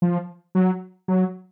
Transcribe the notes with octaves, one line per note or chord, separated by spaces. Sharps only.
F3
F#3
F#3